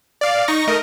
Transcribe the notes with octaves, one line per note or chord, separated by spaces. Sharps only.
D5 F5
D#4 C#6 A#6
A3 A#4 D#5